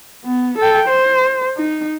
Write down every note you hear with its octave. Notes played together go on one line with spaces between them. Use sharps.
B3
A4 G5
C5
D#4